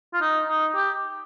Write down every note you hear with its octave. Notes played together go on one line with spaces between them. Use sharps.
F4
D#4
D#4
G4